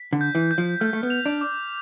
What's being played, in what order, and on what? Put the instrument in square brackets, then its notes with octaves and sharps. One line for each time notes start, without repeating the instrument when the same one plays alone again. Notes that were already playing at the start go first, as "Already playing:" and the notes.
Already playing: [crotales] B6
[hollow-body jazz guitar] D3
[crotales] G6
[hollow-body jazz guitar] E3
[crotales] G6
[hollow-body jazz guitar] F3
[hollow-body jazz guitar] A3 [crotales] F6
[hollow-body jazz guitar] A3
B3
[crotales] F7
[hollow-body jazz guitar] D4
[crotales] D6